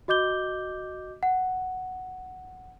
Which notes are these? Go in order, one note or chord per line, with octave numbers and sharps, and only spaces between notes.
F#4 D#5 D6 G6 G7
F#5